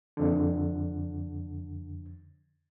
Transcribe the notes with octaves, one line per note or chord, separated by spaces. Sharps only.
F2 D3